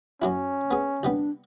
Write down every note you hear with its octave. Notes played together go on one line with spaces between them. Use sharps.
F#2 F#3 C#4 E4
B3 G#4
C2 G3 B3 D4